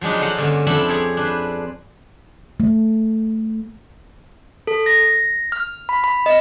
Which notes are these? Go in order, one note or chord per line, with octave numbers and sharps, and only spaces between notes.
F3 F#3 G#3 D4 D#4
A4 C5 D5 D#5 F5 F#5
G2 D3 A#3 C#4
F2 C4 D4 A4 E5 B5
G#4 C#5 D5
D4 B4 C5
A3
A4
A#6
F6
B5
B5
D#5